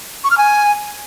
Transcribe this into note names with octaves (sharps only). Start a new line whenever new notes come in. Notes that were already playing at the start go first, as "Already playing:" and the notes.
C#6
F6
G#5